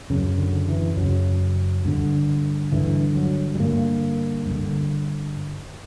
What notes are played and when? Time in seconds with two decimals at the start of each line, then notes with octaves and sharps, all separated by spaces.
0.10 F#2 C#3
0.38 D3
0.69 E3
0.97 F#2 C#3 F#3
1.85 G2 D3
2.72 G2 D3 E3
3.16 F#3
3.55 G3
3.59 G2 D3 A#3
4.47 G2 D3